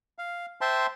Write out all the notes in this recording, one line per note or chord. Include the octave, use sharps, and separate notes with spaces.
F5
C5 E5 G5 A5 C6